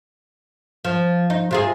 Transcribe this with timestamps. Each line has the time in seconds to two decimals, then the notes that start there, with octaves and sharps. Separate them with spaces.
0.85 F3
1.30 D#4
1.51 C3 F4 G#4